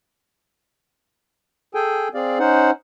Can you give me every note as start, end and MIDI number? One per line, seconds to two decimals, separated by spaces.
1.74 2.08 68
1.74 2.08 69
1.74 2.08 79
1.74 2.08 80
2.14 2.39 60
2.14 2.39 68
2.14 2.39 74
2.14 2.39 77
2.39 2.71 61
2.39 2.71 63
2.39 2.71 72
2.39 2.71 78